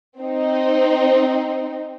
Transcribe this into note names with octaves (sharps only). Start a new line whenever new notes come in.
C4 D#4